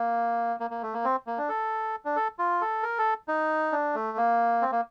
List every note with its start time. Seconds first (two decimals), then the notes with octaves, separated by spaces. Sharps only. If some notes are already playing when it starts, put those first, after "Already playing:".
Already playing: A#3
0.60 A#3
0.71 A#3
0.83 A3
0.94 A#3
1.04 C4
1.27 A#3
1.38 D4
1.49 A4
2.05 D4
2.16 A4
2.39 F4
2.61 A4
2.83 A#4
2.98 A4
3.28 D#4
3.72 D4
3.95 A3
4.17 A#3
4.62 C4
4.72 A#3